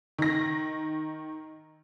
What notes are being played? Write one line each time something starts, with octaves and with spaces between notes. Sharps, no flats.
D#3 A#6